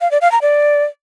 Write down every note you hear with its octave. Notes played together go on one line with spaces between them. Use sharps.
F5
D5
F5
A#5
D5